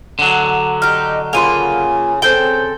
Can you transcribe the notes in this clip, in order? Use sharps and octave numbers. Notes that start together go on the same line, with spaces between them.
D3 F#3
D#4 G4 F6
C#3 A#3 F4 B4 C6 D#7 F7
C#3 C4 A4 C5 G5 G6 G7